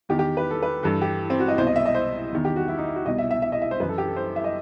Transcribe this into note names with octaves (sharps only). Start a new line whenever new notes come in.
E2 D#3 G4
G4
B4
A4
B4
G2 E3 A4
G4
C4
F#4
D#5
C2 B2 C5
D#5
E5
D#5
C5
E2 D#3
G4
F#4
E4
D#4
E4
F#4
C2 B2 D#5
E5
E5
E5
D#5
E5
C5
F#2 E3 B4
A4
G4
A4
C5
E5
D#5